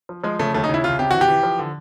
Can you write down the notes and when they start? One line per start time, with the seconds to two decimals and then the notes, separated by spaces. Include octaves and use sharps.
0.09 F3
0.24 F3 G#3
0.39 C#3 A3
0.54 D#2 A3
0.64 D#4
0.69 C#3 E4
0.84 C2 F4
0.99 C3 G4
1.11 E3 F#4
1.21 G4
1.28 E3
1.43 F3
1.59 D3